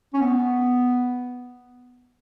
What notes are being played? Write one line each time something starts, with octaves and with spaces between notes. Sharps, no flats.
C#4
B3